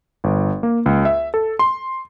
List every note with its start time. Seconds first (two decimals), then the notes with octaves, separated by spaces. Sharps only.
0.24 G1
0.63 A#3
0.86 C#2
1.05 E5
1.34 A4
1.59 C6